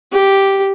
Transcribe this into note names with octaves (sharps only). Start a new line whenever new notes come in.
G4